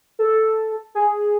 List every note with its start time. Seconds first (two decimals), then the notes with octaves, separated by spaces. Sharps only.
0.19 A4
0.95 G#4